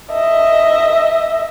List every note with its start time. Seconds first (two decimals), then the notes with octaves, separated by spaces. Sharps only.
0.12 D#5 E5